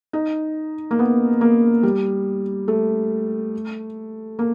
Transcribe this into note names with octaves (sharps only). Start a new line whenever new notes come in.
D#4
A#3
B3
A#3
G3
A3
A#3